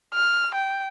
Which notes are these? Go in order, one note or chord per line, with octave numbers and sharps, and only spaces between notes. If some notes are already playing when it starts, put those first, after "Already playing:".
F6
G5